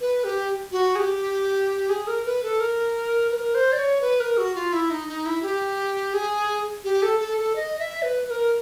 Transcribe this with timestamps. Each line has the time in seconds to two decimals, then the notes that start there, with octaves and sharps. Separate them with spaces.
0.01 B4
0.24 G4
0.72 F#4
0.96 G#4
0.99 G4
1.90 G#4
2.07 A#4
2.25 B4
2.43 A4
2.60 A#4
3.31 B4
3.35 A#4
3.55 C5
3.72 D5
3.79 C#5
4.01 B4
4.20 A#4
4.37 F#4
4.55 F4
4.73 E4
4.90 D#4
5.08 D#4
5.26 E4
5.43 G4
6.14 G#4
6.84 G4
7.02 A4
7.20 A4
7.38 A4
7.56 D#5
7.79 E5
8.02 B4
8.26 B4
8.30 A#4